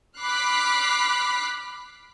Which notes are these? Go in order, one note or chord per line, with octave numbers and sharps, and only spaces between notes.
B5 D6 F6 F#6 B6 C7